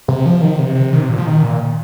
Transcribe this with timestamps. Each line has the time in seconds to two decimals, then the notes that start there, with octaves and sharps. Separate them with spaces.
0.08 C3
0.26 F3
0.42 D#3
0.59 C3
0.75 C3
0.93 D#3
1.01 C3
1.09 A#2
1.18 F3
1.26 D#3
1.43 A#2